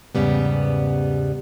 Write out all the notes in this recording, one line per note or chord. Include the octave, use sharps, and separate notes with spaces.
E2 G#2 C#3 G3 B3